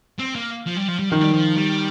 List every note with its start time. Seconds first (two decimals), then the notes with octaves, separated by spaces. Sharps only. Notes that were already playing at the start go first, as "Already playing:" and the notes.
0.19 C4
0.35 A#3
0.66 F3
0.77 G3
0.88 F3
0.99 G3
1.10 D#3 F3
1.21 G3
1.33 F3
1.57 G3